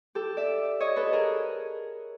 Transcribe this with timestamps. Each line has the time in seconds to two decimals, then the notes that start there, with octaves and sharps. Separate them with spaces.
0.15 G4 A4
0.37 D5 E5
0.80 C#5 D#5
0.96 A4 B4
1.13 G#4 A#4